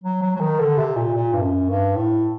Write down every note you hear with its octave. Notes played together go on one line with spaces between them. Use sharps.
F#3
F#3
F#3
D#3
D3
C3
A#2
A#2
G2
F#2
G2
A2